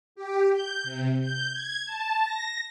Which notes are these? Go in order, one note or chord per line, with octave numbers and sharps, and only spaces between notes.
G4
G6
C3
G6
G#6
A5
A#6